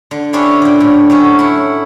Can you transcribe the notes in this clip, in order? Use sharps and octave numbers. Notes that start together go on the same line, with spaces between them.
D3
C#4 D4 E4 G4 C5 C#5
A#2 D3
A2
F#3 A3 C#4
E4 F#5